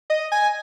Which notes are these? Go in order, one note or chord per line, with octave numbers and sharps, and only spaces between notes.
D#5
G#5